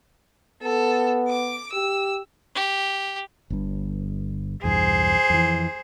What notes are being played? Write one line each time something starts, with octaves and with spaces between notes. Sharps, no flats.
B3 A4
D6
G4 E6
G4
G1 G2
B1 E2 G2 G#4 C5
F2 E3